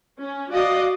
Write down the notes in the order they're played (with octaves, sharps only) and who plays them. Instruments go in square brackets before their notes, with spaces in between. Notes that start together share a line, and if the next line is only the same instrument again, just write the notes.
[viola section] C#4
[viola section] F#4 D5 D#5 [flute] F5